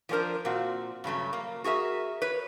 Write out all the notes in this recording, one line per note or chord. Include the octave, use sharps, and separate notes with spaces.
F3 A#3 C4 D4 A#4 C5
A#2 C4 F#4
G2 C#3 F#3 A3
A#3
F#4 G#4 A#4 E5
B4 C#5